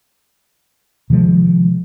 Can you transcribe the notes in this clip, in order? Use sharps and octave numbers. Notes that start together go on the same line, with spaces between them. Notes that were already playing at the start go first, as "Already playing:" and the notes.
C3 D#3 F3 G#3